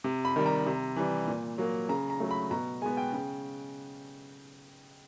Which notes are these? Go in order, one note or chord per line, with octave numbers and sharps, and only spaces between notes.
C3
B5
D#3 G3
A#5
C3
E3 G3
A#2
F#3 A#3
C#3 A#5
A#5
F#3 A3
B5
B2 A#5
G#3 B3 G#5
G5
C#3